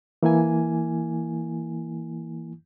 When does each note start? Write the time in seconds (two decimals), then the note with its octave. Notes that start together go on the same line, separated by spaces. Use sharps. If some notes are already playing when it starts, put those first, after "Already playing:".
0.23 E3 A#3 E4 G#5